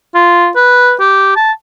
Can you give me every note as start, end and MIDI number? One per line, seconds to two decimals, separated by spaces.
0.15 0.49 65
0.56 0.94 71
1.00 1.34 67
1.36 1.52 81